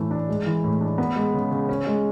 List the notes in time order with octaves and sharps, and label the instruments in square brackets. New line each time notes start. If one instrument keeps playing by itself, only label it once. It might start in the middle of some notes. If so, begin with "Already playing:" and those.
Already playing: [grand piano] A2 E3 A3
D4
G#3
E3
A2
D4
B3
G#3
C#3
C#3
C#4
G#3